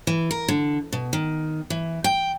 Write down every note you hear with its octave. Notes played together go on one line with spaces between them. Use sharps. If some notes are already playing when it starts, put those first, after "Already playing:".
E3
A#4
D3
B2
D#3
E3
G5